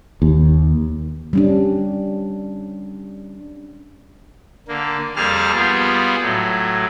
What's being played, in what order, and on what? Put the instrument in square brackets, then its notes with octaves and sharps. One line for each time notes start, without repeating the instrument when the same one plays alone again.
[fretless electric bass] D#2
[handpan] G3 C#4 D4
[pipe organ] D3 A#3
F2 G3 A#3 G#4 A5 F6
G3 B3 F4 G#4
A2 F#3